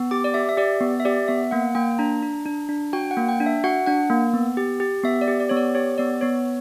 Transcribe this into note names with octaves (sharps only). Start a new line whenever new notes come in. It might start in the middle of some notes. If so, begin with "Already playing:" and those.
Already playing: B3
G4 D6
D5
G4 E5
E5
G4 D5
B3
E5
G4 D5
B3 E5
A#3 F#5
A#3 G5
D4 A#5
D4
D4
D4
F#4 G5
F#5
A#3
G5
D4
E5
F#4 F#5
D4 F#5
A#3
B3
G4
G4
B3 E5
D5
G4
D5
B3 C#5
D5
G4 C#5
B3 D5
B3 C#5